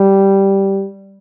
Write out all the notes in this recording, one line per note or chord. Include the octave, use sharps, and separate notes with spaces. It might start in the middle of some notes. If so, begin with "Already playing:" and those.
Already playing: G3